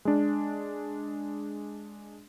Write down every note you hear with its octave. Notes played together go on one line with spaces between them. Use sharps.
G#3 D4